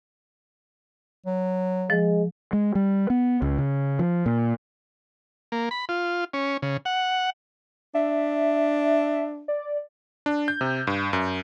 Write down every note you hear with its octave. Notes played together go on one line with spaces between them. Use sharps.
F#3
F3 G#3
G#3
G3
B3
C#2
C#3
F3
A#2
A#3
B5
F4
C#4
C#3
F#5
D4 E5
D5
D4
G6
C3
G2
F#2